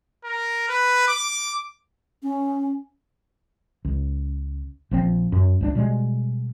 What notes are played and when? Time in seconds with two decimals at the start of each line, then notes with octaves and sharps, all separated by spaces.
0.24 A#4
0.68 B4
1.08 D6
2.23 C#4
3.85 C#2
4.91 A#1 F3 C4
5.32 F#2
5.61 C#2 F#3 D4
5.75 B2 G3 G#3